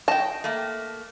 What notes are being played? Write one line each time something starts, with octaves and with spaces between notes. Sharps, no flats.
D#5 G5 A5
A3 A#3